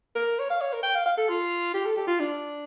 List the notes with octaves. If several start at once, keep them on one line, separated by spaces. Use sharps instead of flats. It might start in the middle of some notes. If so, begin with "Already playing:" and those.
A#4
C#5
F5
C#5
A#4
G5
F5
F5
A4
F4
G4
A4
G4
F4
D4